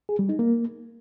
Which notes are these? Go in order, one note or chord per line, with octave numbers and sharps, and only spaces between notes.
G#4
G3
D#4
A#3